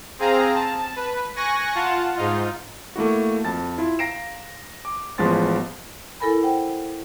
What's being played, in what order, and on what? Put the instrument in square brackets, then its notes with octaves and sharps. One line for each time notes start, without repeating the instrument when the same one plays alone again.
[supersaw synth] C4 G#4 F5 A#5
A5
B4
G#5 C#6 F#6 A#6
F4 F#5 A5
G#2 D#4 F4
[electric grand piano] A3 A#3 E4 F#4
F2 A5 A6
E4 F4
F5 A#5 A#6 C7 D7 E7
D6
A1 F3 G#3 B3 C6 A6
[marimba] E4 A4 A#4 G#5 B5
C5 F#5 G5